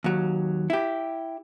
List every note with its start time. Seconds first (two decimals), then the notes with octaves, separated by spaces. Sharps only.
0.04 D#2 F#3
0.70 E4 G4